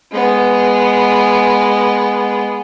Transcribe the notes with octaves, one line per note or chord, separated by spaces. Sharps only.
G#3 B3